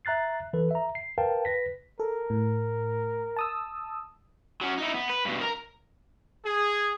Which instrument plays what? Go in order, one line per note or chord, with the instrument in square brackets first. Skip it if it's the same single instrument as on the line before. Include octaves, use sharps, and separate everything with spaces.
[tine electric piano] E5 A#5 F#6 A6 C7
E3 A4 B4
E5 A#5
C7
A#4 B4 F5 G5 A5
B4 A#6 B6
[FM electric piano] A4 [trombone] A#4
[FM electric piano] A2
A5 D#6 E6
[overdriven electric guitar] F#3 C#4
D#4 E4
B3
B4
G2 B2
A#4 A#5
[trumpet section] G#4